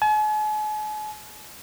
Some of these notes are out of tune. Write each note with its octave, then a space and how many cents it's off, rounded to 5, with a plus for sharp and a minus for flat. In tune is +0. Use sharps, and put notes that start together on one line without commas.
G#5 +45